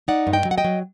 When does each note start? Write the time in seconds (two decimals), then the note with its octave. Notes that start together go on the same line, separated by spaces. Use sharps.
0.08 D#4 D5 F#5
0.27 G2
0.33 D#5 G5
0.45 F#3
0.51 F#5
0.58 D#5 G5
0.65 F#3